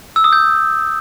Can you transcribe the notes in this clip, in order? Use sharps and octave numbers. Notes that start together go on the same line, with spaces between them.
E6
D#6
G6